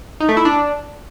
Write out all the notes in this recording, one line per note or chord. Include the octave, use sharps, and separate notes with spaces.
D#4
A3
E4
D4